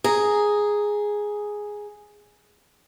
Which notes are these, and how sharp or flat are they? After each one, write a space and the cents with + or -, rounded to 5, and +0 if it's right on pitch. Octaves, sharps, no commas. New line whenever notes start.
G#4 +0 A#5 -5